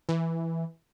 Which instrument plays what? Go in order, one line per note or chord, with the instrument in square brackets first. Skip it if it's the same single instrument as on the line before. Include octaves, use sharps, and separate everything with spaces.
[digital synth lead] E3